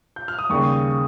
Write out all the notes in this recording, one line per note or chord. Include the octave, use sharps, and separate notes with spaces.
G6
F6
D#6
D#2 C#3 G3 C#6